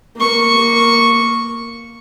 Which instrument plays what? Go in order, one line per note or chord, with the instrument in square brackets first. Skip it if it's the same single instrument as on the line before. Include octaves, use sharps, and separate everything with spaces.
[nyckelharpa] A#3 C#6